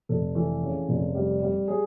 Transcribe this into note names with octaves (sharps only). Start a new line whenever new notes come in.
F1 A4
E3 A4
C#3
F1
G3
G3
G3 G#4